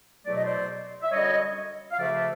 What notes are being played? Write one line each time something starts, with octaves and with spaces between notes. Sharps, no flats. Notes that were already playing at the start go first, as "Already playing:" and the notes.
E2 B2 F#3 A3 D5
D#5
C5 D5
E5
F#2 D3 G3 C#5 D#5
F5
D2 C#3 F3 A3 D5 E5